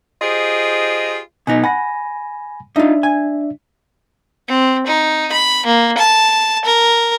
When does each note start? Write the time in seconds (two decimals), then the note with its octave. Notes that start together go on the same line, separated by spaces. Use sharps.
0.22 F4 G4 G#4 C5 D#5
1.47 B2 B3 D#4 G#5
1.64 F#5 G#5 B5 A#6
2.76 D4 D#4 F4 D5 E5
3.03 G#5
4.48 C4
4.86 D#4
5.32 B5
5.66 A#3
5.98 A5
6.65 A#4